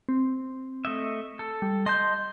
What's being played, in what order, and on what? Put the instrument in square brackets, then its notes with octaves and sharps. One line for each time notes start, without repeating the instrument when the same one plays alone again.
[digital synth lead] C4
[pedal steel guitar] A3 D#5 E5
A4
[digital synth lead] G3
[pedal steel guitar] D#5 A5 G6 [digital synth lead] C6